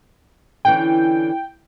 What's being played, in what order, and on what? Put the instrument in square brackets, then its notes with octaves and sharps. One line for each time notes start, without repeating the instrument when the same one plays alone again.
[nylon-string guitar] D3 E3 C#4 [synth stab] G5